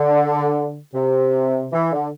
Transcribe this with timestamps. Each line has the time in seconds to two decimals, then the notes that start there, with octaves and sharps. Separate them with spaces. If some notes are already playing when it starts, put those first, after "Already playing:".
Already playing: D3
0.94 C3
1.72 E3
1.92 D3